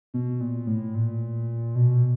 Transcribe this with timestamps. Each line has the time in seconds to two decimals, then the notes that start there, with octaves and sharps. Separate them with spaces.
0.14 B2
0.41 A#2
0.67 A2
0.95 A#2
1.75 B2